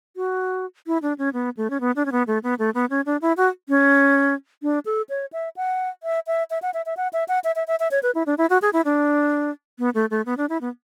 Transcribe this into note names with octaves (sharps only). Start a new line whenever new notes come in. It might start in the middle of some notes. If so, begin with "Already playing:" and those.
F#4
E4
D4
C#4
B3
A3
C#4
B3
D4
C#4
B3
A3
B3
A3
B3
C#4
D4
E4
F#4
C#4
D4
A4
C#5
E5
F#5
E5
E5
E5
F#5
E5
E5
F#5
E5
F#5
E5
E5
E5
E5
C#5
B4
E4
D4
E4
F#4
G#4
E4
D4
B3
A3
A3
B3
D4
E4
B3